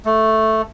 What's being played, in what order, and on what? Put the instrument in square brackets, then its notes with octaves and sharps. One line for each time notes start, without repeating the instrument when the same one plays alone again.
[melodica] A3